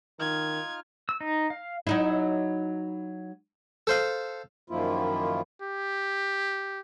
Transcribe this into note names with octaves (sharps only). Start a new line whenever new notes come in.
D#3 D#4 F4 F6 G#6
E6
D#4
F5
F#3 D#4 E4
A4 C5 F5
F#2 D#3 F3 A#3 E4 F4
G4